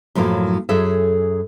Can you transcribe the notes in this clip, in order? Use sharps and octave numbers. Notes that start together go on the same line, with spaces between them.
F#2 A2 F3 F#3 A#3
F#2 G#4 A4 C#5 E5